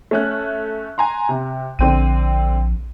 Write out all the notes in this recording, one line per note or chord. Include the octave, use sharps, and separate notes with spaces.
A3 C#4 F#6
G#5 A#5 C6
C3
A#1 D3 C4 D#7